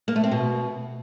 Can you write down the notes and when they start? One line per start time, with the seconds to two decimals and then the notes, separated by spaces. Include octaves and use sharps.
0.08 A#3
0.16 A3
0.24 C4
0.31 B2